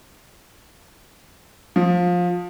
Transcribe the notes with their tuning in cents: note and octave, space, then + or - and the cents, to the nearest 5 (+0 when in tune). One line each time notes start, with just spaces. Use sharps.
F3 +20